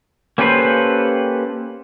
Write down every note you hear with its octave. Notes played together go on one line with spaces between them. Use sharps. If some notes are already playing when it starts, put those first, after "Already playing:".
A#3 C#4 G4 A4 B4 C5